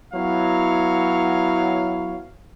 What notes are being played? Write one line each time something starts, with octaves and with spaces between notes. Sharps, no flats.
F#3 B3 E4 C#5 F5